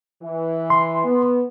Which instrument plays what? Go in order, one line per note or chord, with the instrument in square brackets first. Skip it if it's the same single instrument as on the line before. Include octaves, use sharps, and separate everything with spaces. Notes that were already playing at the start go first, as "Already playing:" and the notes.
[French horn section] E3
[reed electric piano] C6
[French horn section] B3